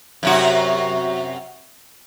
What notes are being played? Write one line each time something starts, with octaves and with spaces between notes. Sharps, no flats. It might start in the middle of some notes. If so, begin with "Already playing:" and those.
F#2 C3 F#4